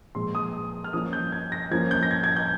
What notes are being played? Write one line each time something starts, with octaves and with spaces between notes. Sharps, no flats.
A#2 F3 G#3 C6
D#6
F6
F3 A#3 C#4 D#6
G6
G#6
A#6
F3 A#3 C#4 G#6
G6
A#6
G#6
G#6
G6